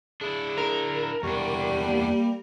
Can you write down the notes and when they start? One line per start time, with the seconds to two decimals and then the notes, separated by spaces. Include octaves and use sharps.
0.21 D4 E4 G#4
0.58 A#4
1.23 E2 G3 D4 C#6
1.86 A#3